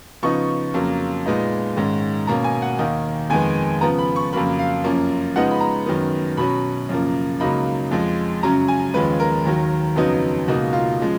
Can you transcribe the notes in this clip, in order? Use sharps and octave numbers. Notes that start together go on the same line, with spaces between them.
C#3 F3 B3 D#4 C#6
F2 C#3 F#3 A#3
A#2 G#3 B3 D#4
G#2 D#3 G#3 C#4
B2 A#3 C#4 A#5
G#5
F#5
D#2 D#3 A#3 D#4
F2 D#3 G#3 B3 G#5
C#3 F3 B3 A#5
B5
C#6
F2 C#3 F#3 A#3 B5
F5
F#2 F3 A#3 C#4
C#3 F3 G#3 B3 D#4 F#5
B5
A#5
F#2 D#3 F#3 B3
B2 F#3 C#4 B5
F#2 C#3 F3 A#3
C#2 C#3 F#3 A#3 D#4 B5
F2 F3 G#3
F#2 C#3 F#3 C#4 A#5
G#5
D#2 C#3 F3 G#3 B4
A#4
D#2 D#3 F#3
F2 C#3 F#3 B3 D#4
C#2 B2 A#3 D#4 F#4
F4
C#3 F3 G#3